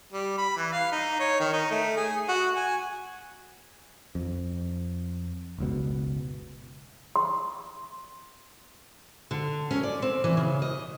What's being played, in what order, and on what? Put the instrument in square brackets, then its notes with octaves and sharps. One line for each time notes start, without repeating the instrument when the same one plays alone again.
[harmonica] G3
B5
E3
F5
D#4
C#5
D#3
D#4
A3
G#4
F#4
G#5
[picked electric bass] F2
F#1 C#2 B2
[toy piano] C6
[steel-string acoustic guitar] D3
C#4
D5
C4
E3
C#3
D#5